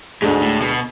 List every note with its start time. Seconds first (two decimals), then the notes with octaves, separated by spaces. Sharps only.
0.22 D2 G#2 D3 G#3
0.42 A2
0.61 B2